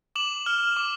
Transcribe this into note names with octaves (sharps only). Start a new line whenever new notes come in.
D6 E7 F#7
F6
D6